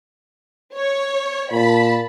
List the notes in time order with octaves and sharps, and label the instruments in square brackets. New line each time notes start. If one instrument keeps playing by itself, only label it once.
[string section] C#5
[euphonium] A#2 [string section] A5 B5